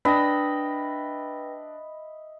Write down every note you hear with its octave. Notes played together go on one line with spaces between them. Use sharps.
D4 B4 D#5 E5 G5 B5 A#6